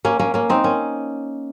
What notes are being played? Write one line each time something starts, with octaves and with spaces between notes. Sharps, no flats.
A#3 C#4
A#3 C#4
A#3 C#4
C4 D#4
A#3 C#4